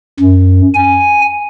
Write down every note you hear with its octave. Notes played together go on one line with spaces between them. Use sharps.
F#2
G#5